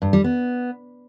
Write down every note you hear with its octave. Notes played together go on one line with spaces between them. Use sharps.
G2
G3
B3